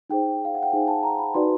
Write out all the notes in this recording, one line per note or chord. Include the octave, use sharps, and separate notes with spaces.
D#4 G#4 C5 G5
F5
F#5
G5
D#4 G#4 C5 G#5
A5
A#5
B5
D#4 F#4 B4 D5 C6